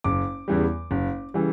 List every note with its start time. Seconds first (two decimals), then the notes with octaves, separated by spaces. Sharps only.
0.04 F#1 D6
0.48 E2 C#3 E3 G3
0.91 F#1
1.34 C#3 E3 G3